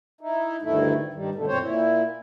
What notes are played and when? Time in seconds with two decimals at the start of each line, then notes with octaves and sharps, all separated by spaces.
0.21 D#4 E4
0.62 D2 G2 D#3 A3 E4
1.14 G2 D#3 G3
1.35 G2 B2 D3 A3
1.47 F#2 A#2 C4 C5 C#5
1.61 A#2 E4